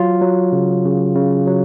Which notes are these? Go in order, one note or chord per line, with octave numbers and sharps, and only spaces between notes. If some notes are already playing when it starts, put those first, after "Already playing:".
Already playing: F#3 F4
F#3
C#3
C#3
C#3
F#3